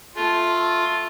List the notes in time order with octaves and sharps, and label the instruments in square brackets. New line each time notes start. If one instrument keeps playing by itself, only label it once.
[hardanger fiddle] A3 [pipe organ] F4